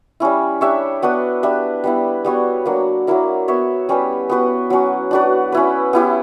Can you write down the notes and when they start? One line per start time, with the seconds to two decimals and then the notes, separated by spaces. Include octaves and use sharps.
0.20 G3 C#4 E4
0.61 D4 G4 C#5 E5
1.02 B3 D4 F#4 B4
1.43 D4 G4 B4 E5
1.84 G3 B3 E4
2.25 G3 B3 F#4 C#5
2.66 F#3 A#3 D4
3.07 F#3 A#3 E4 A#4
3.48 B3 F#4 C#5 E5
3.89 G3 C#4 G4 B4
4.30 B3 F#4 B4
4.70 F#3 C#4 F#4
5.11 D4 F#4 B4 D5
5.52 C#4 E4 B4
5.93 B3 E4 G4